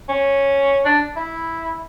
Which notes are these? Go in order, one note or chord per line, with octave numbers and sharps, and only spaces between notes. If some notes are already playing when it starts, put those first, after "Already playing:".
C#4
D4
E4